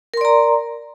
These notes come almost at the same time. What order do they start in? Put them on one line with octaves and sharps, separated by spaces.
A#4 C6 D5 A#5